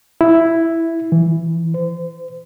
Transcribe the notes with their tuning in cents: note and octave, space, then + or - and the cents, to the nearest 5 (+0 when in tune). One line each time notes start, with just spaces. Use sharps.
E4 +0
E3 +5
C5 -35